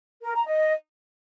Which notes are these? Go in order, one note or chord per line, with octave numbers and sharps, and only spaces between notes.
A#4
A#5
D#5